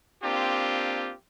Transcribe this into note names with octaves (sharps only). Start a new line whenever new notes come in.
A#3 C4 D4 F4 G4